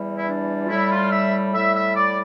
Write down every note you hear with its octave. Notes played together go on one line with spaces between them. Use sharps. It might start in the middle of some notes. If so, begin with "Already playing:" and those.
Already playing: E2 E3 G3
E4
D4
F4
A2 G3 E4
F4
E5
A2 G3 E5
E5
D5